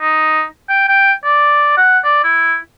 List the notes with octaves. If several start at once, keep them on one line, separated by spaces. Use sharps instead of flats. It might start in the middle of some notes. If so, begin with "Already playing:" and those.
D#4
G5
G5
D5
F#5
D5
E4